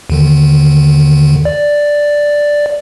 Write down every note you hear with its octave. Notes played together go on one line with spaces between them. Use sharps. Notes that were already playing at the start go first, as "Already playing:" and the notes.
D#2 D3 D#3
D5